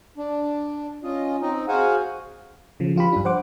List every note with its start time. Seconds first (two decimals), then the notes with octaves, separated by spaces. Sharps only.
0.18 D4
1.03 C#4 F4 D#5
1.41 C4 D#4 D#5
1.68 F#4 G#4 C5 F5 F#5 G#5
2.80 C#3 F3
2.96 F3 F4 G4 B5
3.13 G2 D4
3.25 C5 F#5 D6